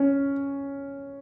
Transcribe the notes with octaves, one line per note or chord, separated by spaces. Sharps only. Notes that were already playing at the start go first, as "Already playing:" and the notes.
Already playing: C#4